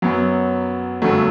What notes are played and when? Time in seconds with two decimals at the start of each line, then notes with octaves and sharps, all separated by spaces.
0.02 F#2 F#3 B3
1.02 G1 F#2 F#3 A3